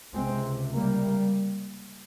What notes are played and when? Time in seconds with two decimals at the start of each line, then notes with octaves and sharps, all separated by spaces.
0.13 C#2 C3 G#3 C4
0.74 G3 A#3